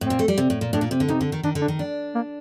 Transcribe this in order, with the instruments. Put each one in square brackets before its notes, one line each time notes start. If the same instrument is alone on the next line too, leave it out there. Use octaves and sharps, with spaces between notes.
[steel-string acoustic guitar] A2 [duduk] C4
[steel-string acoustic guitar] A#2
A3
G3
C3
A2
A#2
[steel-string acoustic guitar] A2 [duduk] D4
[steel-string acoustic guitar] A#2
C3
D3
[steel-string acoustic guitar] C3 [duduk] D#4
[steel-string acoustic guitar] D3
D#3
[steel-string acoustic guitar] D#3 [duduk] D4
[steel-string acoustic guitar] D3
[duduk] D4
[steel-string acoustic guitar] D#3
D4
[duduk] A#3